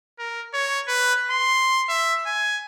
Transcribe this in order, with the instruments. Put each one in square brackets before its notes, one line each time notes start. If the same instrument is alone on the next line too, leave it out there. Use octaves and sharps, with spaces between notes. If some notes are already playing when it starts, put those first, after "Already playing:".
[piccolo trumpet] A#4
C#5
B4
C6
E5
G#5